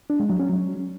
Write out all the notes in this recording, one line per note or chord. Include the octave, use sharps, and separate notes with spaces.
D4
G#3
F#3
C#4
F#3